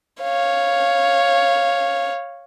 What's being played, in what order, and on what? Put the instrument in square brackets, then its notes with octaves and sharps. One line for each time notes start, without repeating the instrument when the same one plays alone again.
[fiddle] C#5 F5